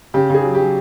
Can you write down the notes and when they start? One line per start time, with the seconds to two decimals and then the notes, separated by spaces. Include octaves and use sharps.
0.14 C#3 G4
0.30 C#3 G#4
0.44 F#3
0.55 F#3 G4